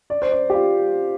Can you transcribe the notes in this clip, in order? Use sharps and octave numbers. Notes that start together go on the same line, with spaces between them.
D5
C5
D5
G4
F4